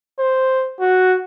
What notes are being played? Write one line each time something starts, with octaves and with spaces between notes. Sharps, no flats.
C5
F#4